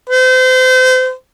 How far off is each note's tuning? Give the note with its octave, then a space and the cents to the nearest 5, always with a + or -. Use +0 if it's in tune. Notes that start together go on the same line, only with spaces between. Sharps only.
C5 -35